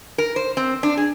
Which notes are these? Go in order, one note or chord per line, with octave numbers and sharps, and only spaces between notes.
A#4
C5
C4
D4
G#4